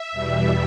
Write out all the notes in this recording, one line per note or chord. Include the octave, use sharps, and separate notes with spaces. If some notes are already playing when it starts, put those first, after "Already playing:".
Already playing: E5
E2 B2 G3